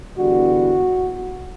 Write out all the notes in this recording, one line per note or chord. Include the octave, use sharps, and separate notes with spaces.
E2 D3 G3 F#4